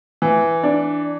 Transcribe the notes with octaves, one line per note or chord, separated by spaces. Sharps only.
E3
D4